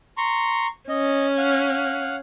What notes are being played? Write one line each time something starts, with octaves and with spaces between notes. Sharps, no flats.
A#5 C6 C#6
C#4 D#5
F5 F#5